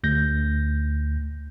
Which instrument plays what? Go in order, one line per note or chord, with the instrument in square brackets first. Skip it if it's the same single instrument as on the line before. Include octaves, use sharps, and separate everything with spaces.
[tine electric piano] D2 G6 A#6